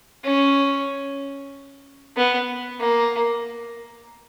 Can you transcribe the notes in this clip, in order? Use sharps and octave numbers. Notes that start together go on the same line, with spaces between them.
C#4
B3
A#3